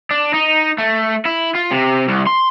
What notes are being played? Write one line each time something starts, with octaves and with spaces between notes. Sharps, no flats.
D4
D#4
A3
E4
F4
C3
C2
C6